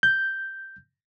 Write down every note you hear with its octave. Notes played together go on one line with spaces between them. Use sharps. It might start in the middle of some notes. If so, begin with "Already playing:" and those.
G6